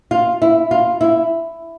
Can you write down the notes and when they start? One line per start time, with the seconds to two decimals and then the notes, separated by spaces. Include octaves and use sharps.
0.11 F4
0.42 E4
0.71 F4
1.01 E4